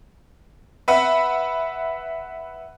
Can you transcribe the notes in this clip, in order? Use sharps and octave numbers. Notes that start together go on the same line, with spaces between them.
B4 E5 F#5